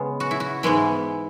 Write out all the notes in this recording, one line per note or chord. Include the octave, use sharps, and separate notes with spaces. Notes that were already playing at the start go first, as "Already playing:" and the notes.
Already playing: C#3 G#3 B3 G#4
F#4
E4
F#4
G#2 E3 G#3 B3 E4